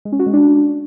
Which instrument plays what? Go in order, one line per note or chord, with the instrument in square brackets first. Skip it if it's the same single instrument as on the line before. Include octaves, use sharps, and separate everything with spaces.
[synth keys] G#3
C#4
F#4
G#3
D4